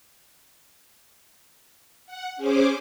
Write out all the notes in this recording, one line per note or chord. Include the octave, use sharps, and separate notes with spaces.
F#5
C#4 G#4 C5 D6